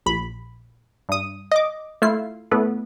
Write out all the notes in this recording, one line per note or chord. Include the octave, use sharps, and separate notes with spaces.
A#1 B5
G2 D#6
D#5 D6
A3 E4 F4 C7
A2 A3 B3